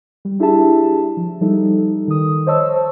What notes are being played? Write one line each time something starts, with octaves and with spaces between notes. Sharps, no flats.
G3
D4 E4 G4 G#4 E5 A5
F3
F3 G3 D#4 A4
D#3 D#6
C5 C#5 D#5 A5 C#6 E6